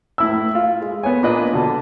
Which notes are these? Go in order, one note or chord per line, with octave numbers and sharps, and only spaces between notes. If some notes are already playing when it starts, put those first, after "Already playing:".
A2 E4 E6
F4
G#3
B3 C#5 G#5
A#2 A#3 D4 B4 D#5
B2 D3 A5